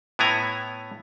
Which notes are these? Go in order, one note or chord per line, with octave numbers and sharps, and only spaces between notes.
A2 B3 E4 G#5 A#5